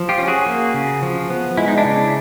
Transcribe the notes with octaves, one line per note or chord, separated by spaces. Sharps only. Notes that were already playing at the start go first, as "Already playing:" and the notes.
Already playing: F3
F4 G4
C#4
F#4 G#4
A#3
C#3
F3
B3
G#3 E4
D#4
D4 E4
C#3